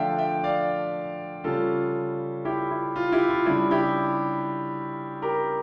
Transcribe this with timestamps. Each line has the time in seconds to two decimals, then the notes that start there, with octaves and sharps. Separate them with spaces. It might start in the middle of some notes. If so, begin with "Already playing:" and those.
Already playing: D3 F3 A3 D4 D5 E5 F5 G5
0.18 E5 G5
0.44 D5 F5
1.44 C#3 G3 C#4 F4 A4
2.45 E4 G4
2.71 E4
2.96 F4
3.12 E4 G4
3.29 F4
3.46 C#3 G3 D4 E4
3.71 E4 G4
5.22 G4 A#4